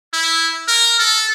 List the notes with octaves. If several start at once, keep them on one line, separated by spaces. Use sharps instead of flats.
E4
A#4
A4